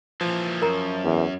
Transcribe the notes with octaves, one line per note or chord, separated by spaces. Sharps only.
A#2 E3 F3
F#2 A#4 A#5
E2